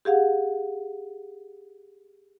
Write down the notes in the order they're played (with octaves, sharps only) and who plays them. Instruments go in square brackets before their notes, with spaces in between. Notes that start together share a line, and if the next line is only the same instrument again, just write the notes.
[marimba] G4 G#4 F5 F#5